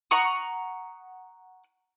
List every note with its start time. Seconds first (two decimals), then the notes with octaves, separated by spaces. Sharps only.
0.11 F#5 A#5 C#6 D#6